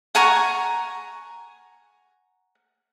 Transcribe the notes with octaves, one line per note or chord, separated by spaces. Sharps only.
F#5 G#5 A#5 C#6